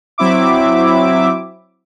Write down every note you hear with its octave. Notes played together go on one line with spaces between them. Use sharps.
F#3 C4 E4 E5 D6